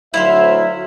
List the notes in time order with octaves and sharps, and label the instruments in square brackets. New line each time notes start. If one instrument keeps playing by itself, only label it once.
[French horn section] D2 F#3 [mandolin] E4 F5 C6 [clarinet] E5